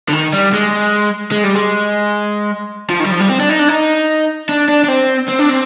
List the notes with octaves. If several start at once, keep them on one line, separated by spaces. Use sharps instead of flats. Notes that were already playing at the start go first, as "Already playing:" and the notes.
D3
D#3
G3
G#3
G#3
G3
G#3
F3
D#3
G3
F3
G3
C4
D4
D#4
D4
D#4
D4
D4
D4
C4
C4
D4
C4